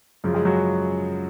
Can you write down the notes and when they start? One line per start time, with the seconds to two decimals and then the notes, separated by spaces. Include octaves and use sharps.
0.24 F#2 C#3 F3
0.34 G#3 G#4
0.45 F#3 F#4